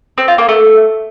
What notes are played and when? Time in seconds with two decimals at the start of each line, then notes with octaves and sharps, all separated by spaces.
0.18 C4
0.28 F4
0.38 A#3
0.49 A3